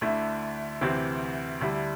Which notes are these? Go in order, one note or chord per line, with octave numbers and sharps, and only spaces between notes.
D2 D3 A3 E4
D2 C3 E3 C4
D2 D3 G3 E4